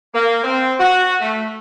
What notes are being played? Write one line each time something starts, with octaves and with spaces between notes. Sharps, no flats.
A#3
C4
F#4
A3